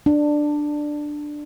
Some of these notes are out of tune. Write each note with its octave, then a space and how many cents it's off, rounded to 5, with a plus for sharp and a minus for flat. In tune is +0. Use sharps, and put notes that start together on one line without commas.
D4 +10